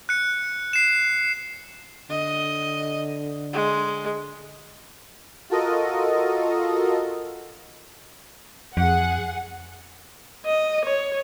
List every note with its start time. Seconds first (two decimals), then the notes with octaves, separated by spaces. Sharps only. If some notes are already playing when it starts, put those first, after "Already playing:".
0.09 F#6 C#7
0.73 C7 E7
2.10 D3 D#5
3.53 G#3
5.50 F4 F#4 A4 A#4 D#5
8.77 F2 G#4 F#5
10.46 D#5
10.85 C#5